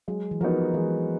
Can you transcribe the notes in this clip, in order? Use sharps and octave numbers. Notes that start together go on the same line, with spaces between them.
F#3 G#3
E3
F3 B3 D#4 F#4 A#4
E3 G#3